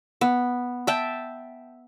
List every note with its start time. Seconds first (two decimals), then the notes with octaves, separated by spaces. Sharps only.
0.21 B3
0.87 E5 G5 A5